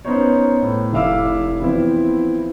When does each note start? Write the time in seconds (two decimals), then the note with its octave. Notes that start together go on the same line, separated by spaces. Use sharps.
0.05 B3 C#4 D#4 C5 C#5
0.62 A2
0.93 F1 E4 E5 F5 D6 E6
1.60 E3 F3 B3 C4 E4